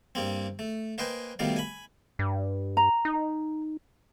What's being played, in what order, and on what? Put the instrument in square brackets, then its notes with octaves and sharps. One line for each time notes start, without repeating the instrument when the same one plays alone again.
[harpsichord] G2 A#3 C4
A3
A#3 B4 C5 D#5 G5 G#5
B2 D#3 G3 A3 F5
G#5 B5
[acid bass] G2
[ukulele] A#5
[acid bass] D#4